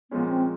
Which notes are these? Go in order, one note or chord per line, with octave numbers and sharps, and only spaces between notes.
A#2 F3 G#3 B3 C#4
C4